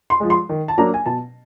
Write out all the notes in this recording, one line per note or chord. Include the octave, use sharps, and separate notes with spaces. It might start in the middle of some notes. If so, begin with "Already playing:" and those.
C6
F3 G#3
C6
D#3
A5
F#3 A#3 D4 A#5
G#5
B2 A5